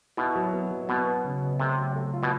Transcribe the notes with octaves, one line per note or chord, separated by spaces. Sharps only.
B2 E4
F#3
B3
F#3
B2 B3
B3
C#3
C#3
C3 A3
F#3
A3
F4
B2